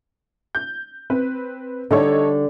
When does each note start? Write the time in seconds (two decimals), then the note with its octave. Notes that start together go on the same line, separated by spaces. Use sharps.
0.55 G6
1.10 C4 B4
1.91 D3 G3 D#4 A4 C#5